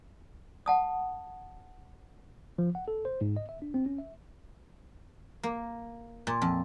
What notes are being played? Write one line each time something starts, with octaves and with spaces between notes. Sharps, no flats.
F#5 A5 D#6
F3
F#5
A4
C5
G#2
D#5
E5
D4
C4
C#4
E5
A#3
A#2
F2